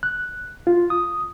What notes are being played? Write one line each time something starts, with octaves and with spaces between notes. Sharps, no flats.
F#6
F4
D#6